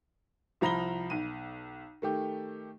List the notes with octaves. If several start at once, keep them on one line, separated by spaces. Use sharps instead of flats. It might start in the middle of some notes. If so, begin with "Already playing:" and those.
C2 F3 A#5 B5 A#6 G7
B1 D#7
D#3 A3 G4